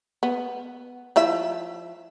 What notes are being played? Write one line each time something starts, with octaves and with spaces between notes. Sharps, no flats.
B3
F3 E4 E5